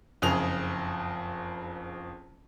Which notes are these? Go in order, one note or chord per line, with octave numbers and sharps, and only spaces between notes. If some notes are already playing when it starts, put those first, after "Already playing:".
F#1 F2 G#4 F7